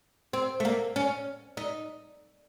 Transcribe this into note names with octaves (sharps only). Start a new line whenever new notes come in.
C4
A3
A#3
C#4
D#4